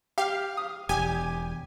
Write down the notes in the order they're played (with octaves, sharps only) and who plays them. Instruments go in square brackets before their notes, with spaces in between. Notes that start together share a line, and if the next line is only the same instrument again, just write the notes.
[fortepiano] G4 [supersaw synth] F5
[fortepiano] D#6
[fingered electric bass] E1 [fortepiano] G4 [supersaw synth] G#5